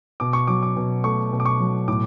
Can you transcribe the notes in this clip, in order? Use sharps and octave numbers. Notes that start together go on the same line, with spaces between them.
B2 D6
C#6
F#3 D6
D6
B2
A3 C#6
B2
D6
C#6
F#3
A2 D6